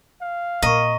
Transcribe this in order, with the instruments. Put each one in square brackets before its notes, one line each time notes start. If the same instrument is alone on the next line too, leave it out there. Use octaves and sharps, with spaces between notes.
[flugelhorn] F5
[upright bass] A#2 [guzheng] D#5 [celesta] A#5 C#6